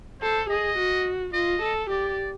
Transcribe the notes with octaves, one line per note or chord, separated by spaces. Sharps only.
A4 C5
G#4 D#5
F#4
F4 D#5
A4
G4 D5